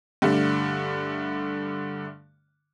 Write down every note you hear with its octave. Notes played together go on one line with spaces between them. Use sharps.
G2 D3 A3